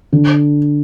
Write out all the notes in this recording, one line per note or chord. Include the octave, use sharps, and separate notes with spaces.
D3